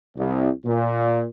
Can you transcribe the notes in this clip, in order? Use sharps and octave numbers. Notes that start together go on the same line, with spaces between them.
C2
A#2